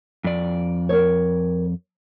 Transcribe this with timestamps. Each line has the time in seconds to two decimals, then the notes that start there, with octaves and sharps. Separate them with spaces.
0.24 F2 D5
0.89 A#4 C#5